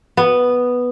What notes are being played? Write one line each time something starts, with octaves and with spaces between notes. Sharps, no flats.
B3